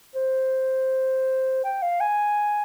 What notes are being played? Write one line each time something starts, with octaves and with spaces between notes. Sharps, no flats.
C5
G5
F5
G#5